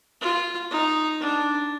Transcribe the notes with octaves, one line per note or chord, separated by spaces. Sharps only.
F4
D#4
D4